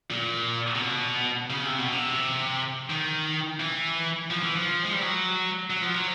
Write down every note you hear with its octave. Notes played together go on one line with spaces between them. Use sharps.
A#2
C3
B2
C#3
C3
B2
C3
D#3
E3
F3
E3
F3
G#3
G3
F#3
F#3
F3
F#3